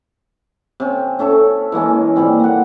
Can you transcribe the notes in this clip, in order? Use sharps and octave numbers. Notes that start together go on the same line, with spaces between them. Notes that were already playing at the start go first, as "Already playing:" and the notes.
C3 C#4
C#4 A4 E5 C#6
E3 G#3 A#3 C#4
A#2 D#3 G3 C4
A#3 F#5